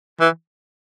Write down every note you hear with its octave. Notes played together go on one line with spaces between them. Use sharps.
E3